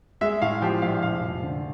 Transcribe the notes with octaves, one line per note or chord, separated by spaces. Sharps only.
G#3 E5
A2 F5
F3 G4 G5
A#1 F5
F1 F5
F2
D3